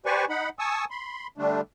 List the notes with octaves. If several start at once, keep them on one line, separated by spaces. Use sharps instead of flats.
G4 B4 C5 D5 G#5 C#6
D#4 F#5 B5
G#5 A5 C#6 D#6 E6
B5 C6
D3 G3 A3 D4